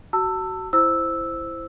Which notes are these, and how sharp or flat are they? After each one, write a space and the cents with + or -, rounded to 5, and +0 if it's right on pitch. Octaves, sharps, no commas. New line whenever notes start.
F#4 +25 A5 +30 E6 +5
E4 +10 C5 +0 E6 -5